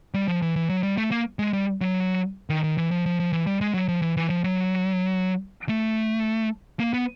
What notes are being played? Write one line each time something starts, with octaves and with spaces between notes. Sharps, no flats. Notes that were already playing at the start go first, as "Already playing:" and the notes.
G3
F3
E3
E3
F#3
G3
A3
A#3
G#3
G3
F#3
D#3
D#3
E3
F3
F3
F3
E3
G3
G#3
F#3
F3
E3
E3
F3
F#3
A3
A#3
B3